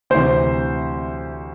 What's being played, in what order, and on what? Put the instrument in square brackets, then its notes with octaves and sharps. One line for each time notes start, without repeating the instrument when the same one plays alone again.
[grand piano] D2 C3 E3 C5